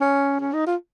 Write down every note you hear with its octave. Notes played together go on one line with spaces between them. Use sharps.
C#4
C#4
D#4
F4